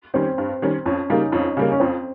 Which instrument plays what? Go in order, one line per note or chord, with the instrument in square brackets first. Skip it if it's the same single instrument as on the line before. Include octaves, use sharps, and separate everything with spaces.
[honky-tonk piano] D#3 G3 C#4 [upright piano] C4
[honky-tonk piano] G2
D#3 G3 C#4
[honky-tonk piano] F2 [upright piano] C#4
[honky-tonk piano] C#3 G3 A#3 [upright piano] D#4
[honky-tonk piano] F2 [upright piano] C#4
[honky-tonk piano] C#3 G3 A#3
[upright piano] C#4
[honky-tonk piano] F2 [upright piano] C4